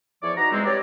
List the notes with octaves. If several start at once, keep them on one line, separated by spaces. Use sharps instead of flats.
E2 E3 F3 C#5 D5 D6
D#4 F#4 B4 A#5
E2 G#3 C4
G4 B4 C#5 D5